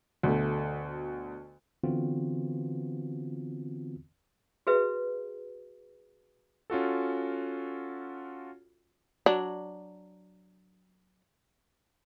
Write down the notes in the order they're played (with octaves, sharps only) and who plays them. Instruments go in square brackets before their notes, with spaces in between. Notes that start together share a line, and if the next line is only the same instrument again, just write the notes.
[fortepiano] D2 B2 A3
[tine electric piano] D3 E3 B3 C4 F4 F#4
[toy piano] F#4 G#4 B4 E5
[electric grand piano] C#4 F4 F#4 A4
[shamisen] F#3 D4